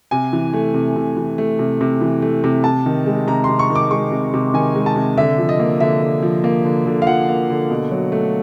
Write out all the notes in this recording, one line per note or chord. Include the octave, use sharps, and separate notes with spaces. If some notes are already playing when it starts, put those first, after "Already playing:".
C3 G#5
E3
A3
C3
C3
E3
A3
C3
C3
E3
A3
C3
C3 A5
D#3
G#3
C3 A#5
C3 C6
C#6
D#3
D6
G#3 C#6
C3
C3
D#3 G#5
G#3
A5
C3
D3 E5
F3
D#5
A#3
D3 E5
D3
F3
A#3
D3
D3
F5
F3 F#5
A#3
D3
B2
F#3
A3